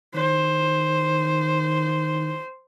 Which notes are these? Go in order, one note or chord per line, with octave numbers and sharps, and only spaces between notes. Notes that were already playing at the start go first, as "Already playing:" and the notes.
D#3 C5